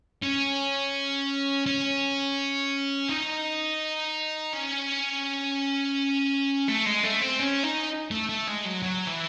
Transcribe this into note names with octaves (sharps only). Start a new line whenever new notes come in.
C#4
C#4
D#4
C#4
A3
G#3
A3
C4
C#4
D#4
A3
A3
G#3
F#3
F#3
E3